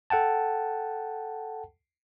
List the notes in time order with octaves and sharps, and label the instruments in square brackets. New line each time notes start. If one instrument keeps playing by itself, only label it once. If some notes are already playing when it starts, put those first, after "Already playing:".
[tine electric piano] A4 F#5 G5 A5